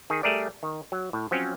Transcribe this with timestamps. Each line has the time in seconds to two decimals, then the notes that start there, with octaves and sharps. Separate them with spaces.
0.10 D#3 G#4
0.23 G3 A3 G#4 A#4 D5
0.63 D#3
0.92 F#3
1.13 A2
1.31 F3 F#3 C4 C#4